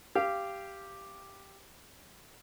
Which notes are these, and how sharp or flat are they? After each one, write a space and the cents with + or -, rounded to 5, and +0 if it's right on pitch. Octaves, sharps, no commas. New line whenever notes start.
G4 +0 F5 -20